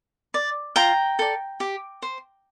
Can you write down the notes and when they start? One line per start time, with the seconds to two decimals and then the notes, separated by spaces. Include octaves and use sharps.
0.34 D5
0.76 F4 G5 A#5
1.19 A4 D5
1.60 G4
2.02 C5